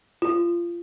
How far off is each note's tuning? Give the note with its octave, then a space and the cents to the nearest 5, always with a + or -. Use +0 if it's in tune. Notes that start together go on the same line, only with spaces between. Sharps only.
F4 -25